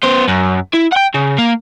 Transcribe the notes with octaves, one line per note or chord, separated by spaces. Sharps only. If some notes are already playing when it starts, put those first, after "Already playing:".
B3 C5
F#2
E4
F#5 G5
C#3
A#3